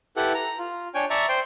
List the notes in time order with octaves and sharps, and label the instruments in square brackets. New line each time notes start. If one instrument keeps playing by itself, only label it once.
[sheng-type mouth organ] E4 G4 A4 B4 F#5
A#5
F4
D4 C#5 G5 G#5
D5 E5 A5 A#5 C#6
C5 G5 C6